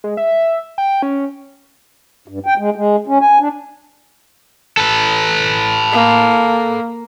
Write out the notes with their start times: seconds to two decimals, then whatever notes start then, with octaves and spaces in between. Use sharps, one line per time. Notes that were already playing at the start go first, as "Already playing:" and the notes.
0.04 G#3
0.17 E5
0.78 G5
1.03 C#4
2.28 G2
2.46 G5
2.58 G#3
2.76 G#3
3.07 C#4
3.21 G#5
3.39 D4
4.77 A4 B4
5.93 A#3